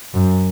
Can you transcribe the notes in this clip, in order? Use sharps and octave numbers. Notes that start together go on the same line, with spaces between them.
F#2